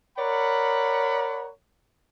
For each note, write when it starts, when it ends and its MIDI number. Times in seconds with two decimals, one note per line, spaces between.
0.17 1.49 70
0.17 1.49 73
0.17 1.49 74
0.17 1.49 78
0.17 1.49 83